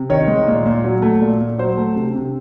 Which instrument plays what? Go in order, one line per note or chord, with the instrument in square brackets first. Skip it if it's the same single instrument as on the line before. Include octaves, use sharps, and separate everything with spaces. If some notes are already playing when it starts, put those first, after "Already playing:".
Already playing: [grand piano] C3
D#3 C#5
G#3
A#2
A#2
F#3
A3
A#2
A#2
F#3 C5
A3
C3
C3